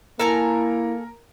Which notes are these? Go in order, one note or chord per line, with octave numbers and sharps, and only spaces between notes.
A#3 E4 A4 A#4 G#5 A#5